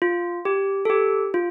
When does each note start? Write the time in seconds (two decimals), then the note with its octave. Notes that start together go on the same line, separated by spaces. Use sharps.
0.02 F4
0.45 G4
0.85 A4
0.90 G4
1.34 F4